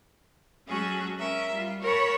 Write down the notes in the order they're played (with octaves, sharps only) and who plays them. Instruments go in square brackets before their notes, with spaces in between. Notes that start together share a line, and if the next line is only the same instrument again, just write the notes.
[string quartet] F#3 G#3 C#4 F#4 G#4 A4
C#4 A#4 E5
G3 F4
A#4 C#5 F#5 A5 B5